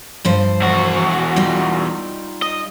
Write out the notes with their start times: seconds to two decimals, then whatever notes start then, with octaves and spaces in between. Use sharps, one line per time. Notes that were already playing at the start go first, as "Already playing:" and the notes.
0.25 G2 F3 C5
0.62 E2 F#4
1.36 G3 D#4 F4
2.42 D#5